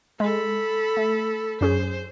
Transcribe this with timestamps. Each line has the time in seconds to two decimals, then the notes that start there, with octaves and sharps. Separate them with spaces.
0.20 G#3 A4 B5
0.97 A3
1.61 F#2 C#4 G#4 C5